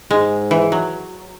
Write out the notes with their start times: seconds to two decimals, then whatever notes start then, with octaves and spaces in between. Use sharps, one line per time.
0.11 G#2 G#3
0.51 E3
0.72 F#3